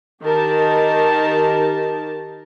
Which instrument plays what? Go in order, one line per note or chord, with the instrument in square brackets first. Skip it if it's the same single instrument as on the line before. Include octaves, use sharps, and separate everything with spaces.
[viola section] D#3 G4 A#4 A5